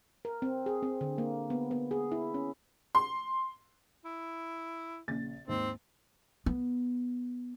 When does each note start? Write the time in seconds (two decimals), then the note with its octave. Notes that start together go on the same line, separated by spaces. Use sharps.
0.25 A#4
0.42 C4
0.66 G#4
0.83 C4
1.01 D3
1.18 A#3
1.50 B3
1.71 B3
1.91 G#4
2.12 E4
2.34 C#4
2.95 C6
4.05 E4
5.08 A#1 C#3 A6
5.48 D#2 G#2 C4
6.46 B3